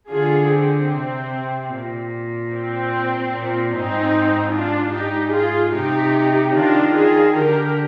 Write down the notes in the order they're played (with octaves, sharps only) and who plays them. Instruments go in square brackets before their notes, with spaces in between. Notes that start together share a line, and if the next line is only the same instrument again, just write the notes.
[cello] D3 [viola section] F4 G#4
[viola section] C4
[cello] C3
A#2
[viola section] C4
[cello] A#2
[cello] G#2 [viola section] C4 D#4
[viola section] D4 F4
[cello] G#2 [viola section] D#4 G4
[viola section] F4 G#4
[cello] C3 [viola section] D#4 G4
[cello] D#3 [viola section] D4 F4
[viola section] F4 G#4
[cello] D3 [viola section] G4 A#4